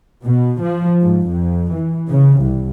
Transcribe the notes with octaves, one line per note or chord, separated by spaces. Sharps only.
B2
F3
G#2
F2
E3
C#3
C2